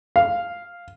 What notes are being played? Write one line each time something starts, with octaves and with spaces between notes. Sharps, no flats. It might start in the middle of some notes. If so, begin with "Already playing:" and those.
F5